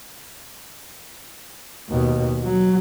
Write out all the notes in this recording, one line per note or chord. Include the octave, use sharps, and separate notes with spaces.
D#2 B2
F#3